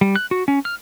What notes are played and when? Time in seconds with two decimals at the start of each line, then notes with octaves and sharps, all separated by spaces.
0.01 G3
0.16 F#6
0.31 F#4
0.48 C#4
0.65 F6